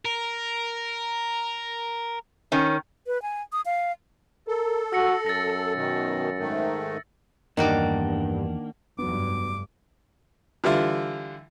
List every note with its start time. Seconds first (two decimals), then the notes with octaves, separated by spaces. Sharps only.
0.05 A#4
2.52 D#3 C#4
3.07 B4
3.22 G#5
3.52 D#6
3.66 F5
4.48 A4 A#4
4.93 F#4 E6 A#6 C#7
5.26 F#2 A6 A#6
5.75 B2 D#3
6.39 G#2 D#3 A3
7.57 E2 G2 D#3 A#3 D4 F#4 D5 D#5
8.99 F1 G2 F#3 B3 D6
10.64 D3 E3 G3 E4 F4